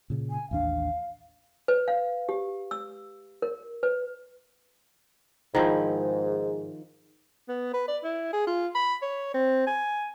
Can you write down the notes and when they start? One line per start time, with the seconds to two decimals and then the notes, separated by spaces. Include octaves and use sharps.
0.10 A#2 C#3
0.30 G#5
0.51 A1 D#2 D4 F5
1.68 B4
1.88 F5
2.29 G4
2.71 E6
3.42 A#4
3.83 B4
5.55 G#2 D#3 F3 E4
7.48 B3
7.73 B4
7.88 D5
8.03 E4
8.33 G#4
8.47 F4
8.75 B5
9.02 C#5
9.34 C4
9.67 G#5